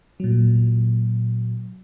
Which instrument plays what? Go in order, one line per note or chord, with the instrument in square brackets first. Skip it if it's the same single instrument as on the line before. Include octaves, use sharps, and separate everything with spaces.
[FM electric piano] A#2 F#3